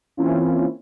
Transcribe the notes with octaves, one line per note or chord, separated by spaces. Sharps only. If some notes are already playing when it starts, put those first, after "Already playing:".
E3 A#3 C4 C#4 E4 F4